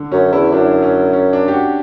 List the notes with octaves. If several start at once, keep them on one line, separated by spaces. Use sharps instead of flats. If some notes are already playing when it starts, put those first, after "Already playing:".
Already playing: D3
F#2 C#4
E2 E4
F#2 D4
C#4
C#4
D4
G4
F#4